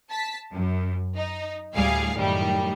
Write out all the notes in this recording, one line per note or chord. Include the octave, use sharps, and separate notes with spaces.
A5 B6
F#2
D#4
D2 A2 G3 G#4 F5
F#2 A2 D#3 G3